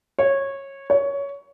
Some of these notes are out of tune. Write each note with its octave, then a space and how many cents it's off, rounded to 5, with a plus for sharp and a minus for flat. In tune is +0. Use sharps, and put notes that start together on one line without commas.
C#5 -15
C#5 +15